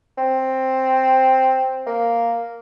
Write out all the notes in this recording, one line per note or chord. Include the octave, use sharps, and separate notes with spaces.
C4
A#3